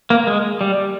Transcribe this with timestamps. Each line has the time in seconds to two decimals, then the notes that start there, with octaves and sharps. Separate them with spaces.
0.10 A#3
0.27 G#3
0.61 G3